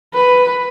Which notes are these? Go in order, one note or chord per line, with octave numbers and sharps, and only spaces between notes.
B4